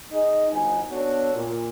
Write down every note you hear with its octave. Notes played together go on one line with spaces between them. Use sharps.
D#4 G#4 D#5
G1 B3 D#4 F#4 G#5
B3 D4 F#4 A4 C#5
A#2